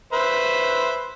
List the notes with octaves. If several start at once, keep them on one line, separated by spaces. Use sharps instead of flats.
B4 C5 E5